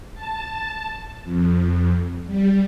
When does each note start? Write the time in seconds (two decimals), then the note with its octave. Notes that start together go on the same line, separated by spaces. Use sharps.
0.14 A5
1.24 F2
2.27 G3